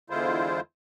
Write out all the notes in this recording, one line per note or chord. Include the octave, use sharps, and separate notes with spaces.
E2 D3 G#3 E4 F4 C5